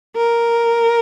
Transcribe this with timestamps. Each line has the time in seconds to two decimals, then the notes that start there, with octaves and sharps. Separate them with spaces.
0.16 A#4